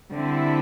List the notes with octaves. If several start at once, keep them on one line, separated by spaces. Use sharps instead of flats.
D3 G3 C4 E4